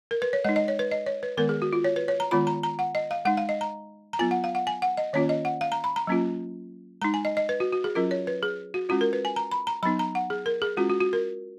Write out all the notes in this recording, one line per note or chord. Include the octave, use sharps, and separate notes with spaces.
A#4
B4
C#5
G#3 D#4 D#5
D#5
C#5
B4
D#5
C#5
B4
D#3 G#3 B3 A#4
G#4
F#4
F4
C#5
B4
C#5
A#5
D#3 G#3 B3 F4 B5
A#5
A#5
F#5
D#5
F5
G#3 D#4 F#5
F5
D#5
A#5
A#5
F#3 B3 F4 G#5
F#5
F5
F#5
G#5
F#5
D#5
D#3 A#3 C#4 F4 C#5
D#5
F#5
F5
A#5
B5
A#5
F#3 A#3 C#4 F4
G#3 D#4 A#5
G#5
D#5
D#5
B4
F#4
F#4
G#4
F#3 C#4 F4 A#4
C#5
B4
G#4
F#4
G#3 C#4 F4 F#4
A#4
B4
G#5
A#5
B5
A#5
F#3 B3 D#4 B5
A#5
F#5
G#4
A#4
G#4
G#3 C#4 F4 F#4
F#4
F#4
A#4